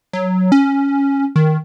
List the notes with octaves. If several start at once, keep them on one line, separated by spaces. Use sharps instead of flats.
F#3
C#4
D#3